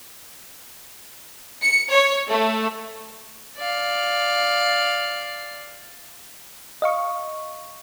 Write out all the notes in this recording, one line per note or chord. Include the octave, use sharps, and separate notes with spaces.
C#7
C#5
A3
D5 F5
D#5 F5 C#6